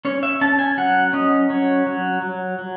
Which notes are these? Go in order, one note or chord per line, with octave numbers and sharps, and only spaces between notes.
C#4 C#5
E5
C#4 A5
G#5
F#3 F#5
C#4 D#5
F#3 C#5
F#3
F#3
F#3